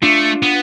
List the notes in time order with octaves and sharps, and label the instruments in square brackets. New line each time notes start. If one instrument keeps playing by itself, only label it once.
[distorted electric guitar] A3 [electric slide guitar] D4 F4
[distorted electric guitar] B3